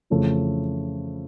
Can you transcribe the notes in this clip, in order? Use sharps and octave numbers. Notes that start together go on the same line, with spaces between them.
F2 C#3 E3 A3